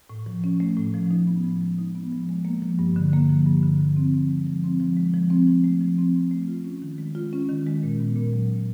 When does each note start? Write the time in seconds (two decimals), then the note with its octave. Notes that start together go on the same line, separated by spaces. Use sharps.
0.10 A2
0.26 F3
0.44 C#4
0.60 A3
0.77 A2
0.94 F3
1.11 D#4
1.27 B3
1.44 F3
1.61 G#3
1.78 D#4
1.95 B3
2.12 F3
2.29 G#3
2.45 A#3
2.63 F3
2.79 G2
2.96 D3
3.13 A#3
3.29 F3
3.46 G2
3.63 D3
3.80 F3
3.97 C4
4.13 F3
4.29 G#3
4.47 F3
4.64 C4
4.80 F3
4.97 G#3
5.14 F3
5.30 C4
5.47 F3
5.64 A3
5.81 F3
5.98 C4
6.14 F3
6.31 A3
6.48 F4
6.65 C#4
6.82 D#3
6.98 G#3
7.15 F4
7.33 C#4
7.49 D#3
7.66 G#3
7.83 A#2
8.00 B3
8.16 A#2
8.33 F#3
8.49 A#2